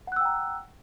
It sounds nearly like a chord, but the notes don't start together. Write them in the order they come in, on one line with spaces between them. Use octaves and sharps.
F#5 F#6 E6 G5 A#5